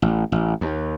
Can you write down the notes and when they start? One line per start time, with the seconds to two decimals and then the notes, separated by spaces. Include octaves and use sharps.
0.02 A1
0.32 A1
0.61 D#2